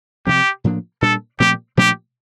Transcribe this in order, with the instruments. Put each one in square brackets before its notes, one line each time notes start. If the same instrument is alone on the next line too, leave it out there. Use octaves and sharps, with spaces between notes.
[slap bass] C3 F3 C4 [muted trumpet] G4
[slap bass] A2 F3 A#3 D4
[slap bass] A#2 G3 D4 [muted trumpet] A4
[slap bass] A#2 F3 A3 C4 [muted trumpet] G4
[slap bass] A#2 F3 A3 D4 [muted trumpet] G4